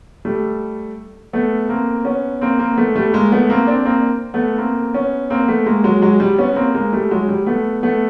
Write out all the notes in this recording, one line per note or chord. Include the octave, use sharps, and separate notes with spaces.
G3 A3
A3 B3
A#3 C4
B3 C#4
A#3 C4
A#3 C4
A3 B3
G3 A3
G#3 A#3
A3 B3
A#3 C4
C4 D4
A#3 C4
A3 B3
A#3 C4
B3 C#4
A#3 C4
A3 B3
G#3 A#3
F#3 G#3
F#3 G#3
G3
B3 C#4
A#3 C4
G#3 A#3
G3 A3
F#3 G#3
G3
A3 B3
A3 B3